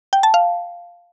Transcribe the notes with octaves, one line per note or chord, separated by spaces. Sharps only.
G5
A5
F5